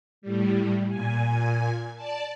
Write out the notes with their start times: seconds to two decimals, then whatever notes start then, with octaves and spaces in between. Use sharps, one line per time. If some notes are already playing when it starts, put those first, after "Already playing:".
0.22 A2 G3
0.88 A#2 G#5
1.95 D5 A5